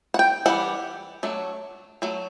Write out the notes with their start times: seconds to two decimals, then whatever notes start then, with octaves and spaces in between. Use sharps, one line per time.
0.14 F#5
0.19 G5
0.46 E3 G3 F#5
1.23 F#3 A3 D4
2.02 F#3 A3